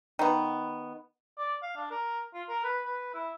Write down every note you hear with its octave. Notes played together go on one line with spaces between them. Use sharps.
D#3 B3
D5
F5
D4
A#4
F4
A#4
B4
B4
E4